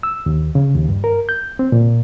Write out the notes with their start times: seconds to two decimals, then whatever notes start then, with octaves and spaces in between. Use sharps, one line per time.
0.03 E6
0.26 D#2
0.55 C#3
0.75 D#2
0.89 G2
1.04 A#4
1.29 G6
1.59 C4
1.72 A#2